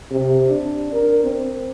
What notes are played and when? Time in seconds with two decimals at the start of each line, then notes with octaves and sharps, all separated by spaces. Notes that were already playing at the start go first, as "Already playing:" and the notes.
0.10 C3
0.49 D4
0.93 A#4
1.24 C4